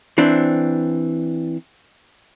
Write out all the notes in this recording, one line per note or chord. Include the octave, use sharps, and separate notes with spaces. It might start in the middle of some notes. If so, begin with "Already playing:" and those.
E3 C4 D4